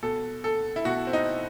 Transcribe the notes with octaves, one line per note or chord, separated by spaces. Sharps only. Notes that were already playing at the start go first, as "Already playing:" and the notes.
B2 A4
A4
E4
B2 F#4
C4
D#4